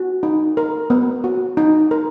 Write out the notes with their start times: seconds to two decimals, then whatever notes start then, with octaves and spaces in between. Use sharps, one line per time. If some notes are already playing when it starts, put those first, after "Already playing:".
Already playing: F#4
0.23 D#4
0.57 A#4
0.90 B3
1.24 F#4
1.57 D#4
1.91 A#4